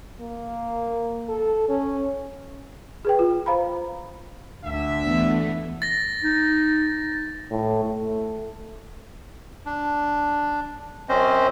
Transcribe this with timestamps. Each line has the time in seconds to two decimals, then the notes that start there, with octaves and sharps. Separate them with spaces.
0.20 A#3
1.29 A4
1.69 C#4
3.05 G#4 B4 G5
3.19 F4
3.46 C5 F5 A#5 B5
4.65 D2 D3 E5
5.02 E3 A3 B3
5.82 A6 A#6
6.23 D#4
7.51 A2
7.83 A3
9.66 D4
11.09 F#2 C4 C#4 C5 D#5